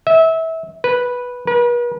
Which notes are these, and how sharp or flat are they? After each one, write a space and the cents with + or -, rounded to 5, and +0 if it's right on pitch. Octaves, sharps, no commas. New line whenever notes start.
E5 -25
B4 -5
B4 -40